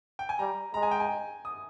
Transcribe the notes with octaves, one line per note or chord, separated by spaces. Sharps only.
G5
G#5
G3 A#5
G#3 A#5
G#5
G5
G#5
D#6